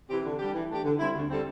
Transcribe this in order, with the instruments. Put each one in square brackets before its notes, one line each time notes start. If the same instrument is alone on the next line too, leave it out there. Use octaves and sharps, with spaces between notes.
[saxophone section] C3 E3 C4 G4
D3
G3 D4 G4
E3
A3 D4 G4
D3
G3 C4 E4
D2
D3 G3 C4 A4